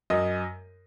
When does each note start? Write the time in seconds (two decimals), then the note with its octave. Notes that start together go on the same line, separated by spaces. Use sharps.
0.10 F#2 D#5